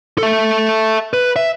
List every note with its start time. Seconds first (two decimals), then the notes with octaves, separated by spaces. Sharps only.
0.18 A4 E5
1.13 B4
1.36 E5